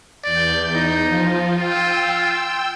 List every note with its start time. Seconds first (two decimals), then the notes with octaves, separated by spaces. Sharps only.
0.24 E2 D5 G6
0.75 D#4
1.05 F3 F4
1.58 F4 G5 E6